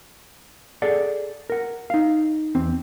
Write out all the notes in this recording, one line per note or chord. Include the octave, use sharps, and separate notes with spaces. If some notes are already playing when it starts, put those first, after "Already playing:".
G#4 A4 D5 F#5
A#4 F#5
D#4 F5
E2 C4